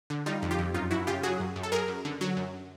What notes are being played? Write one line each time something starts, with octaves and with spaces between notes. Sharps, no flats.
D3
G3 D#4 F4
F2
F4 G4
F2
F#2 D#4 F4
F#2 E4 F#4
C#3 F4 G4
F#3 F#4 G#4
F#2
F#2
A4
F#2 G#4 A#4
F#2
D3
F#3
F#2